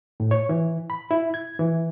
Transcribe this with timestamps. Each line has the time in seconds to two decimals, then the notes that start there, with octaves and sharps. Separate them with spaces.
0.20 A2
0.31 C#5
0.49 E3
0.90 B5
1.11 E4
1.34 G#6
1.59 E3